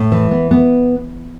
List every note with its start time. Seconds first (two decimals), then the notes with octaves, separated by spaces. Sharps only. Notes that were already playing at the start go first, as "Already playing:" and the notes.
Already playing: A2
0.12 E3
0.31 B3
0.51 B3